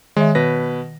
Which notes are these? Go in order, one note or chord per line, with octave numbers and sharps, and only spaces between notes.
D#3 G#3 C#5 E5
B2 B4 A#6